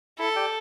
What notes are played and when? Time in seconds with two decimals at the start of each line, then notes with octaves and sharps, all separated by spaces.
0.19 E4 A4
0.36 G4 D5 G5